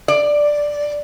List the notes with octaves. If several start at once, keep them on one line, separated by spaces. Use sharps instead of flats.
D5